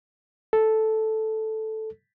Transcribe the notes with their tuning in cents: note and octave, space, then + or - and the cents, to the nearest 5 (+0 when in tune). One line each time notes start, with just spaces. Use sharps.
A4 -5